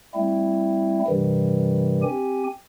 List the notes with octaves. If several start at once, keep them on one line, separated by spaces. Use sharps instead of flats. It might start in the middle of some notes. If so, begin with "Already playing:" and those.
G3 A3 C4 E4
G2 C3 D#3 E3 G3
C4 G4 G#5